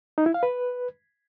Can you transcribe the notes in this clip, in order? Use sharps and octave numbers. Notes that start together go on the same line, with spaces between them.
D#4
E4
F5
B4